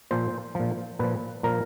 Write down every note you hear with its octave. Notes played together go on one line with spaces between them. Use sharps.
A#2 F3 C5
A#2 F3
A#2 F3 B4
A#2 F3 A#4